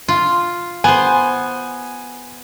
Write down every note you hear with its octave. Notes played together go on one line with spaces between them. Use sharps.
F4
B3 C5 G#5